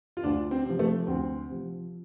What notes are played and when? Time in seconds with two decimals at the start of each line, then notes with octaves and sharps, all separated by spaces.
0.17 F4
0.23 D2 D4
0.51 C4
0.66 C3 F3
0.79 A3
1.07 D2 C4
1.49 C3 F3